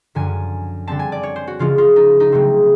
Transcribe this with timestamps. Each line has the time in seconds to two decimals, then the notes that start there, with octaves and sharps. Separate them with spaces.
0.15 F#2 D3 F3 G#5
0.87 D3 G3 C4 A5
0.99 G#5
1.12 D5
1.23 C#5
1.36 C5
1.47 F#4
1.59 C#3 F3 G#3 C#4 F4
1.78 F4
1.96 D#4
2.20 D#4
2.32 C#3 F#3 A3 C4